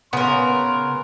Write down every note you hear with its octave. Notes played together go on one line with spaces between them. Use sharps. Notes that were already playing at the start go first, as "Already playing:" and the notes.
C#3 B3 A#4 C6